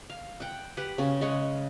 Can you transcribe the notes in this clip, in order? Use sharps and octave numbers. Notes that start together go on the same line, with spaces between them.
F5
F#5 G5
G4 B4 F#5
C#3 C#4
G#3 C#5 F#5